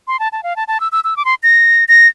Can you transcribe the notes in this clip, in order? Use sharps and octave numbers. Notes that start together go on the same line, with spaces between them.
C6
A5
A5
F5
A5
A5
E6
E6
E6
D6
C6
A#6
A#6